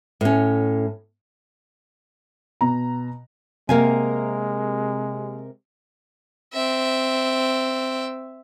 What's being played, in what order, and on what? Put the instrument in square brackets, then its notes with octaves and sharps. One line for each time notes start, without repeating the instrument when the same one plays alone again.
[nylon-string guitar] A2 C#4
[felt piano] B2 A#5
[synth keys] C3 A#4 [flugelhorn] G#3 [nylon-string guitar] A#3 F5 G#5
[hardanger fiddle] C4 E5